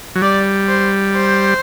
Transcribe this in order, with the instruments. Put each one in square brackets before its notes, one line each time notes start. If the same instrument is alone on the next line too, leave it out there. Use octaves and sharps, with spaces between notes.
[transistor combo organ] F#3
[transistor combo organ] G3 [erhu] D5
[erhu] C5
C5